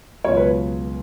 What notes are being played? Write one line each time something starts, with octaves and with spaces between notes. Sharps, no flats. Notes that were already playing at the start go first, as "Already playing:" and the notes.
C#2 B2 F#3 C#5
B4